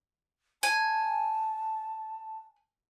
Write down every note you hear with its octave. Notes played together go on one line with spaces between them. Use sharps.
G#5 A5